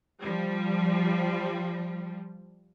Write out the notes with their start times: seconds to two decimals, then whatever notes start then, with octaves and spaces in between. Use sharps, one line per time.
0.22 F3 G3